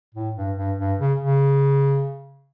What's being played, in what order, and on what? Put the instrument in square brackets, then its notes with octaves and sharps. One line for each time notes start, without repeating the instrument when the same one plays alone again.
[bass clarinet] A2
G2
G2
G2
C#3
C#3